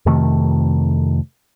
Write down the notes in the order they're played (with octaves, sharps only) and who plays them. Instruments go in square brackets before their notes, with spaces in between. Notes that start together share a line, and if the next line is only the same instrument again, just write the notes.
[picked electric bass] F2 C3 D#3 A3